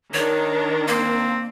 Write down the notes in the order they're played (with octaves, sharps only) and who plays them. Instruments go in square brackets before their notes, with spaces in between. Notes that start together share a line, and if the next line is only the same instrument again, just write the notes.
[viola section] D#3 D4 A#5 [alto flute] A#4 [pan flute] C#5
[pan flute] A#3 [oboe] C4